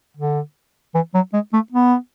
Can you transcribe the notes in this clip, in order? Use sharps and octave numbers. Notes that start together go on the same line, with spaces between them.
D3
E3
F#3
G#3
A3
B3